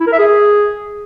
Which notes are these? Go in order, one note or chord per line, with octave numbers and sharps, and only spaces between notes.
E4
A#4
E5
G#4